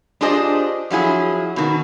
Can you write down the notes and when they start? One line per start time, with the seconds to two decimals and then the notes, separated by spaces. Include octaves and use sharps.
0.21 D4 F4 G4 G#4 C5 D#5
0.90 F3 F#3 E4 G#4
1.56 B2 D#3